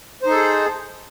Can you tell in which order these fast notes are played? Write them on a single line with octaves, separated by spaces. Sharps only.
C5 D#4 A4 G#4